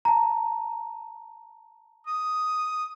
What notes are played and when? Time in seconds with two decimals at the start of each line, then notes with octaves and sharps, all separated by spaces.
0.05 A5 A#5
2.07 D#6